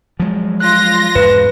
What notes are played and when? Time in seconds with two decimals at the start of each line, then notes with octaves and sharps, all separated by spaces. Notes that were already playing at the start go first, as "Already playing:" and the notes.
0.20 F3 F#3 G#3
0.60 F4 F#6 A#6
1.15 E2 G#2 F3 B4